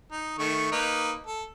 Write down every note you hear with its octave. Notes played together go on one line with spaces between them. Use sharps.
D#4
D#3 A3 C#6
A#3 D#4 B4
A4